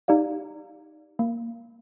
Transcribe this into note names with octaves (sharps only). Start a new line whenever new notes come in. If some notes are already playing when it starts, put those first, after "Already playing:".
D#4 G4 D5 F5
A#3